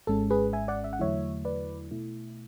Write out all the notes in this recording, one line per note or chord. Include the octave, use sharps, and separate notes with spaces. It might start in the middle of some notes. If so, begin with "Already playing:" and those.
G#1 G#2 G#3 C#4 A4
G#4 B4
E5 G#5
D5 F#5
E5
F#5
E2 D3 F#3 A3 E4 C#5 E5
B4 D5
B2 A3 E4